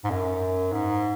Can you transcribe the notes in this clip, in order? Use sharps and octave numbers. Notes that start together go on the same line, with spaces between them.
G#2
F#2
G#2